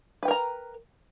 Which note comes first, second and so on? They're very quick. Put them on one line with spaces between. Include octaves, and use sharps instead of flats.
B4 G5 A#4 A#5